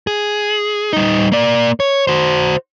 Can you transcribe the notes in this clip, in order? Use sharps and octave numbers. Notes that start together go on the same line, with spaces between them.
G#4
G3 D#4
A#3 D5
C#5
F#4 C5